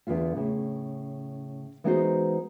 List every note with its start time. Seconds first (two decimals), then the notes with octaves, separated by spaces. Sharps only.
0.07 E2 D3 F4 E5
0.36 A2 C#3
1.84 E3 G#3 B3 D#4 F#4 C5